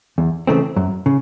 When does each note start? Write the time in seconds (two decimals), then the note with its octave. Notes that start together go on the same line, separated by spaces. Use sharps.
0.18 E2
0.47 C#3 E3 A3 C4
0.76 F#2
1.06 C#3